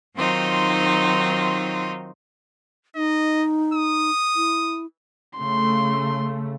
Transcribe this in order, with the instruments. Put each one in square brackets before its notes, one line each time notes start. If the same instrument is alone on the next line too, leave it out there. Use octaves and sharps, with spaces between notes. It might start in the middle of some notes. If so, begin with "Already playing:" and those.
[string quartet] D#3 F#3 C4 D#4 F4
[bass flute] D#4 [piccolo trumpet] D#5
[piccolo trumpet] D#6
[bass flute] E4
[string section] C#3 A3 [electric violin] C6